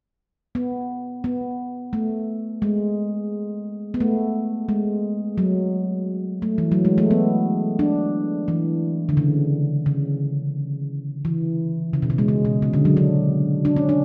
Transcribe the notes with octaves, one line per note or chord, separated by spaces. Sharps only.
B3
B3
A3
G#3
B3
A3
G#3
F#3
A3
E3
F#3
G#3
A3
B3
D4
E3
D3
C#3
C#3
E3
C#3
B2
C#3
G#3
C#3
B2
C#3
D3
F#3
D4
D4
C#4
D4